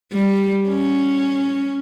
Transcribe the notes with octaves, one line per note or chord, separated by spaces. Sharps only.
G3
C#4